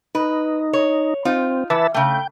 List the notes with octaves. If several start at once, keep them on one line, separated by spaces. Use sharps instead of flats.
D#4 B4
C#5
C4 D#4 F4
E3 B4 E5 A5
C#3 A3 G5